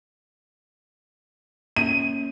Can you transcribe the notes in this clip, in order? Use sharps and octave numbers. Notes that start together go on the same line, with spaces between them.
A#3 C#4 D#7